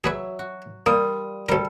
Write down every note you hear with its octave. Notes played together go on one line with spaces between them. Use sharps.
F#3 G#4 B4 C#5 E5
F#4
G3 A#3 F4 A#4 D#6
D2 G3 A4 A#4